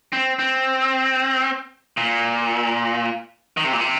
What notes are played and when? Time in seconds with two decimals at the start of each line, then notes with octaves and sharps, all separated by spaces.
0.13 C4
0.39 C4
1.97 A#2
3.57 D#3
3.64 C3
3.73 A#2
3.81 C3